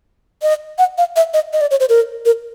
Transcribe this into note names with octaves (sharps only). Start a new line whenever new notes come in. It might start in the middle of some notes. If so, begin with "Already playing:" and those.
D#5
F#5
F5
E5
D#5
D#5
D5
C#5
C5
A#4
A#4